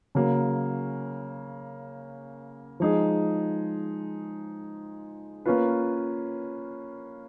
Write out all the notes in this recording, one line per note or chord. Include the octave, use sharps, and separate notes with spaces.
C#3 F#3 A#3
F3 G#3 D#4 G#4
A#3 C#4 F4 B4